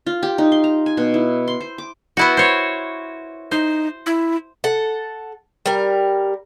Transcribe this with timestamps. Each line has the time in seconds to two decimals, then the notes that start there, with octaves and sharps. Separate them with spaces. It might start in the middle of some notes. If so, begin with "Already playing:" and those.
0.07 F4
0.23 G4
0.38 D#4
0.52 C6
0.64 A#5
0.86 G#5
0.97 B2
1.14 E4
1.48 C6
1.61 C5
1.78 D6
2.17 B3 E4 F#4
2.37 C5 C#5
3.51 D#4 C5
4.06 E4
4.64 A4 F#5
5.66 G3 A#4